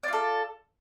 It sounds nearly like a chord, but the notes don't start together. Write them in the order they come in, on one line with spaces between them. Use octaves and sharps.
D5 F4 A4